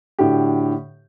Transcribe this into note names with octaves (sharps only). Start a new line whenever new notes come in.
A2 D3 F#4 G4